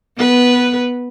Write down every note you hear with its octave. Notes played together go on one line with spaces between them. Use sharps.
B3 B4